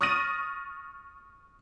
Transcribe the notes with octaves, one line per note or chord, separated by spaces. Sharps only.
C#6 D#6 F6 A6 A#6 D#7